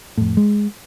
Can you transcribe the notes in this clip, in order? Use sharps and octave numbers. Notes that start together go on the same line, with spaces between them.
F2 A2
G#3